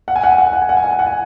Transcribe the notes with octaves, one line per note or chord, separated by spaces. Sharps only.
F#5
G#5
F#5
G#5
F#5
G#5
F#5
G#5
F#5
G#5
F#5
G#5
F#5
G#5